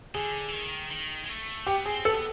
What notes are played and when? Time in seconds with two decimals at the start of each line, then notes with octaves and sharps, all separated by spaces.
0.14 D3 G#4
0.48 E3
0.53 D#3
0.91 D#3
1.24 G#3
1.29 A3
1.66 B3 G4
1.85 C4 G#4
2.04 B3 A4